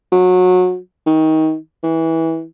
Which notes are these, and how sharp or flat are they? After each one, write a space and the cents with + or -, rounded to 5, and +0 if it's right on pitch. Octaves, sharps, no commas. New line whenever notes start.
F#3 -25
D#3 +20
E3 -20